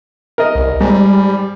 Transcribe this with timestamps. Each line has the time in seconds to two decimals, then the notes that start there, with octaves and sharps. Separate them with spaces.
0.38 A#4 D#5
0.55 C2
0.81 G#2 G3